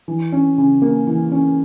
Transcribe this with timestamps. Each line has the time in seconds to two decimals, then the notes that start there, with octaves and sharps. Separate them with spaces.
0.08 E3
0.32 C#4
0.58 C#3
0.82 A#3
1.07 E3
1.32 C#4